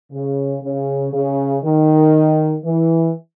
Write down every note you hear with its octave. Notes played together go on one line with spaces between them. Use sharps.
C#3
C#3
C#3
D#3
E3